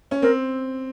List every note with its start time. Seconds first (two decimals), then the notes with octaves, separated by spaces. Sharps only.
0.11 C#4
0.22 C4 A#4